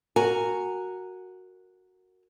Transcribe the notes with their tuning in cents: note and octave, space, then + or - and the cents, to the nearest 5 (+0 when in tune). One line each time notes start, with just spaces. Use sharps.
F#4 -5 A#4 -10 G#5 +0